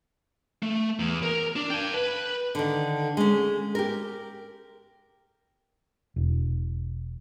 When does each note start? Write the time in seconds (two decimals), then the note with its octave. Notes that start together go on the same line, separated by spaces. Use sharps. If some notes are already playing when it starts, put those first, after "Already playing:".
0.63 A3
1.00 E2
1.23 A#4
1.56 D4
1.70 G5 A5
1.94 B4
2.55 D3 D#3
3.17 G#3 C#4
3.75 G4 A#4
6.16 E1